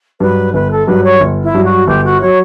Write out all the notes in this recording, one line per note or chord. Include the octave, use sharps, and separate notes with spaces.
G2 F#3 B4
G1 B4
A4
G2 F#3 B4
C#5
G1
E4
G2 F#3
F#4
G1 G4
F#4
F#3 C#5